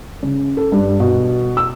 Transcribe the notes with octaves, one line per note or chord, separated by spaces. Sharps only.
C#3
A4
G2
B2
E6